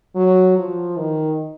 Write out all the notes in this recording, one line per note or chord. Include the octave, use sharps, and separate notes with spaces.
F#3
F3
D#3